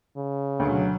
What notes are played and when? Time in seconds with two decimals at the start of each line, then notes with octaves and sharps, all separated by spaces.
0.17 C#3
0.60 D2 B2 F#3